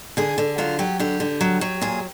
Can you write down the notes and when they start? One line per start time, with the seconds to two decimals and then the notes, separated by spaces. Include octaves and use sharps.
0.17 D3 G#4
0.38 D3
0.58 F#3 F4
0.79 F#3 G4
0.99 D3 G4
1.20 D3
1.41 F#3
1.61 F#3
1.81 A#2 G#4